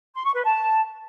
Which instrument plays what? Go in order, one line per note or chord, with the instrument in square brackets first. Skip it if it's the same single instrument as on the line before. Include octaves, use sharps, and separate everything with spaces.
[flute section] C6
C#6
B4
A5